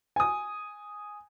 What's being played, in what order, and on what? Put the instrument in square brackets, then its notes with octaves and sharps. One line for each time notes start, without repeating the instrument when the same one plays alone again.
[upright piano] G#5 D#6